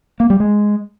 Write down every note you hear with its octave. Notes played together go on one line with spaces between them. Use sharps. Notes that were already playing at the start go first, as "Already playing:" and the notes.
A#3
G3
G#3